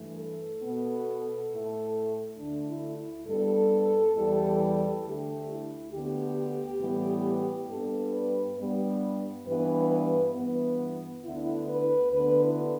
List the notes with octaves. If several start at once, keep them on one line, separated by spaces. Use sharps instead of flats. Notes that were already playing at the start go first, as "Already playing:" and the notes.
Already playing: G2 E3 A3
A4
B2 B3
A2 A3
D2 D3 A3 D4
E4
E4
G2 G3 B3 A4
E2 E3 G3
D2 D3 A3 G4
E4
D2 D3 B3 G4
A2 E3 G3 B3
G2 G3 B3 A4
B4
G2 G3 B3
G2 E3 G3 B3 B4
B4
G2 E3 B3
D2 D3 B3 E4
B4
D2 D3 B3 B4
E4